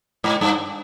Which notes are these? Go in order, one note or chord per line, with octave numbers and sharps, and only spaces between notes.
G#2
G2